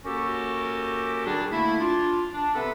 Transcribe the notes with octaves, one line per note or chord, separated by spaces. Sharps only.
A#3 C#4 F#4 G4 A4 A#4
A#2 D#3 G3 D4 F#4 G#4
D3 A3 A#3 E4
D4 F4
D4
C3 B3 C4 A4 B4 E5